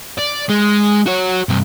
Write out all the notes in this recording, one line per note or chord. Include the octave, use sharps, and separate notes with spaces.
D5
G#3
F#4 C#5
G2 C3